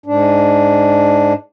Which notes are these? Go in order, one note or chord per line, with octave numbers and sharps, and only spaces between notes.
G#2 D4